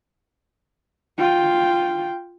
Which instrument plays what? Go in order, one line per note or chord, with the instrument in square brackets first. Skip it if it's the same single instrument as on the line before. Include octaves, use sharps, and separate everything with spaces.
[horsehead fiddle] F4 G5